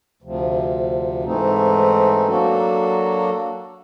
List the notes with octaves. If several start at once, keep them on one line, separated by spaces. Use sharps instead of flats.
D2 C3 F3
G#2 E3 A3 C4 D#4
F#3 A#3 D4 F#4 A4